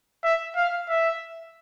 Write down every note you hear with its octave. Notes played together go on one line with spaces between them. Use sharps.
E5
F5
E5